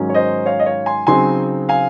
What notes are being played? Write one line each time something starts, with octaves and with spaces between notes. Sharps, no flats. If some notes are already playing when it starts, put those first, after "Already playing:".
Already playing: G#2 D#3 F#3 C#4
C#5
C5 D#5
C#5 F5
D#5
C#5 F5
G#5 C6
C#3 F#3 C4 D#4 G#5 C6
F5 G#5